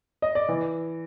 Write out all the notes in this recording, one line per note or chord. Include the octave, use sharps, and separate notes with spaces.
D#5
D5
E3